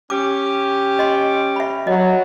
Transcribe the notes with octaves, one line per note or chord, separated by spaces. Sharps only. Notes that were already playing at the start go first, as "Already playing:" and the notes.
C#4 G4 D6
D#5 C6
E5 B5
F#3 D#5